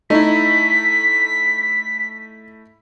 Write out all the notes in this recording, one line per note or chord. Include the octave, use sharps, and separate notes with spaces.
A3 D#4 E4 B6